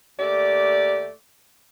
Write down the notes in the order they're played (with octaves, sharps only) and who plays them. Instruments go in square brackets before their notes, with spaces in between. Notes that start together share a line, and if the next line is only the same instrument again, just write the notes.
[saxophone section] D#2 A3 G4 D5